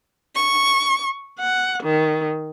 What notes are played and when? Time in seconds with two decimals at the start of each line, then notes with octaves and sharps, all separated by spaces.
0.35 C#6
1.39 F#5
1.84 D#3